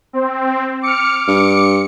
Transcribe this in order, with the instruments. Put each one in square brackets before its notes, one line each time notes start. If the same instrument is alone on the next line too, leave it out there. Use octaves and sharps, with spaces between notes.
[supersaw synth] C4
[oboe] D6 [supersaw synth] F6 C#7
[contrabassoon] G2 [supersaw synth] C#7